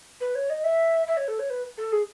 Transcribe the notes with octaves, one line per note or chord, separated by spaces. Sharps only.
B4
C#5
D#5
E5
E5
C#5
A4
C#5
B4
A4
G#4